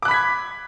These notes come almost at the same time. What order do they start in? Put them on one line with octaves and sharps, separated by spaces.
D6 F#6 B5 B6 G#6